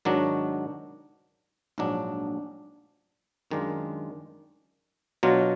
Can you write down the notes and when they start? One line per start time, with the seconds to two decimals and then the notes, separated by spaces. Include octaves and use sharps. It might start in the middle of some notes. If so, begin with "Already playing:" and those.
0.05 G#2 D#3 F#3 D4 F#4
1.78 A#1 G#2 F#3 D4
3.51 F#2 D#3 G#3 D4 F4
5.23 B2 F#3 D4 F4